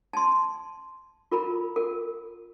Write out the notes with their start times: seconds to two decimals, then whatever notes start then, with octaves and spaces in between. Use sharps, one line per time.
0.13 A5 C6
1.32 F4 A#4 A#5 B5
1.76 A#4